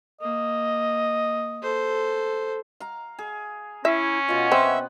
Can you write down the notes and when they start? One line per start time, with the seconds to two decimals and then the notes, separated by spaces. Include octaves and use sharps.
0.21 A#3 D#5
1.62 A4 C5
2.80 F5 A#5
3.19 G#4
3.85 C#4 E4 E5
4.28 B2 F4 D#5
4.52 B3 C4 B4 E5 F#5